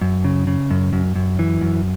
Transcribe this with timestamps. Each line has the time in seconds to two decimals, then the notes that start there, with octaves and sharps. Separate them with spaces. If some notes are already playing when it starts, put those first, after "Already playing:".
0.01 F#2
0.24 C#3
0.47 C#3
0.71 F#2
0.93 F#2
1.16 F#2
1.39 E3
1.61 F#2